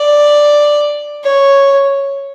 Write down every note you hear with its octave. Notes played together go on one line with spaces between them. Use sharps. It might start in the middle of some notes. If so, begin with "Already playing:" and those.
Already playing: D5
C#5